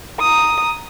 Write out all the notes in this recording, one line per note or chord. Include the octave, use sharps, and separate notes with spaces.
A#5 D#6